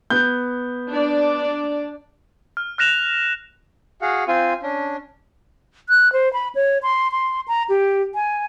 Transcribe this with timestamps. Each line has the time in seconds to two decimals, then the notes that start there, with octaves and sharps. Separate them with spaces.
0.10 B3 G6
0.91 D4 D5
2.57 F6
2.78 F6 F#6 A#6 E7 F7
4.02 F#4 G#4 F5 F#5
4.28 C4 F4 G#5
4.63 C#4 D4
5.89 F#6
6.13 C5
6.33 B5
6.55 C#5
6.83 C6
7.11 C6
7.48 A#5
7.69 G4
8.15 G#5